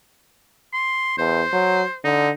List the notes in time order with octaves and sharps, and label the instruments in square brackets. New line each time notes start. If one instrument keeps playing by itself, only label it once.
[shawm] C6
[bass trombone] E2 [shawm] C5
[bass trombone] F#3
[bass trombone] D3 [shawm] D#4